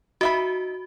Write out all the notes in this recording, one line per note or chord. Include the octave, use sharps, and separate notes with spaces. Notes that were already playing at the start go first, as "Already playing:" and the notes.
D#4 F#4 E5 B5